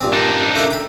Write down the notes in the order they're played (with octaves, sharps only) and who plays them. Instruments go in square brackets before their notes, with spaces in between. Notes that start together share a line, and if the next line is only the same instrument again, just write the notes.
[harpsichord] A#1 G2 C4
[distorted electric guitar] D4 D#4
[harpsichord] A3 A#3 E4
G5 B5